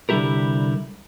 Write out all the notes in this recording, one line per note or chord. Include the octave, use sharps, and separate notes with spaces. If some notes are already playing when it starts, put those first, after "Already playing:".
C2 D3 G3 E4 G4 A#4